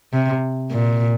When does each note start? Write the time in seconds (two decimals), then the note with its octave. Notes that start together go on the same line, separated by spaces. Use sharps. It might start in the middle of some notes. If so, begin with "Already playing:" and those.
0.13 C3
0.71 A#2